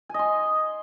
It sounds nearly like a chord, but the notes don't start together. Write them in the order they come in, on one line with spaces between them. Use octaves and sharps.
G#5 D#5 C6